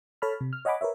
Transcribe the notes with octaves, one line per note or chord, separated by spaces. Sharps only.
A4 C#5 A5 B5 F6
C3
F6
C#5 D#5 F#5 G#5 B5 D6
A#4 B4 C#5 E5